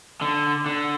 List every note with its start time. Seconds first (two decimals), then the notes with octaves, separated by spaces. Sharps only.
0.21 D3
0.66 D3